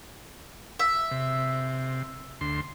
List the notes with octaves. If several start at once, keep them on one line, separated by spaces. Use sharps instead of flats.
E5
C3
D2 C6